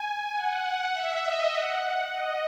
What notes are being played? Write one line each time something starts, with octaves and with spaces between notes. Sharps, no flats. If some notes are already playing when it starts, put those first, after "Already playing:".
Already playing: G#5
F#5
E5
D#5
F#5
D#5